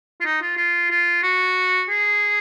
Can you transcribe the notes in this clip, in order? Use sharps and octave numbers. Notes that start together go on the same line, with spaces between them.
F4
D#4
F4
F4
F4
F#4
G#4